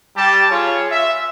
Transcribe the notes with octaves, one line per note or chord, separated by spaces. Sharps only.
G3 G4 A5
F4 G#4 C#5
E5